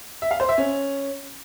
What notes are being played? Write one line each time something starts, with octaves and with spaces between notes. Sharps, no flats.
E5
F5
C5
E5
C#4